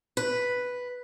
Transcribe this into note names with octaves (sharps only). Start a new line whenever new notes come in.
B4